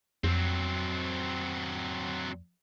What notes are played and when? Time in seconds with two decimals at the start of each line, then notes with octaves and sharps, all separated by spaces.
0.24 F2 F#3 C4